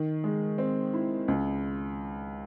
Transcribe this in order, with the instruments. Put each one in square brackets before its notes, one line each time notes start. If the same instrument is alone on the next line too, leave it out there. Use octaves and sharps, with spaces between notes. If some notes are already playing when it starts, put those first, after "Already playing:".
Already playing: [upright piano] D#3
G#3
C4
E4
C#2